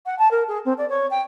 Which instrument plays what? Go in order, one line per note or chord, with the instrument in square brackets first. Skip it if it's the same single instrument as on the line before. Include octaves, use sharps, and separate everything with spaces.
[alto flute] F#5
A5
A#4
G#4
C4
D5
C#5
G5